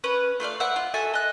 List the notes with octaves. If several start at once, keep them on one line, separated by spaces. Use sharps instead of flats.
C#4 B4
A3 F4 D5 F5
C5 D5 E5 F#5
F4
F#4 A4 E5 G#5
D#5 F#6